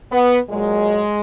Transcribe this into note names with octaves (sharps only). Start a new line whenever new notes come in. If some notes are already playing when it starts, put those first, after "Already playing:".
B3
A#2 F#3 G#3